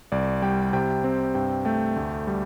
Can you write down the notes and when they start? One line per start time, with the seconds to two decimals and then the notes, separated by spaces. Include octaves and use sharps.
0.12 C2 D5
0.42 G3 G5
0.73 C3 G5
1.04 C4
1.35 G2 G5
1.65 A3 G5
1.96 D2
2.27 G3